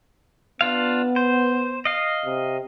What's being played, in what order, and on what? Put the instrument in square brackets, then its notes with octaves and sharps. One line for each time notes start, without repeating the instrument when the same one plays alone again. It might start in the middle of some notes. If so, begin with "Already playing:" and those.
[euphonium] B3 [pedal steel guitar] D4 F4 F5
[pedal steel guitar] C5
D#5 F5
[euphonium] C3